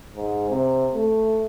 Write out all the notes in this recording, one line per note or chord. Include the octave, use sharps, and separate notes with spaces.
G#2
C3
A3